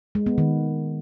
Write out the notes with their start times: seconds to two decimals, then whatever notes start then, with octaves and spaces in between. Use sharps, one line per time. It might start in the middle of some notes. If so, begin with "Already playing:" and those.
0.15 G#3
0.26 B3
0.38 D#3